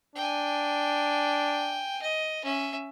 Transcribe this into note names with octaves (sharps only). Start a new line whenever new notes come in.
D4 G5 G#5
D#5
C#4 E5